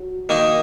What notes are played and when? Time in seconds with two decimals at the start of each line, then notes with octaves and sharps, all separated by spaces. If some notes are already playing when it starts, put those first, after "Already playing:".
Already playing: F#3
0.29 D#3 A#3 D#4